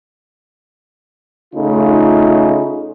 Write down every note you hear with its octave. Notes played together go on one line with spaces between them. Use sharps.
C#3 A3 D#4 F4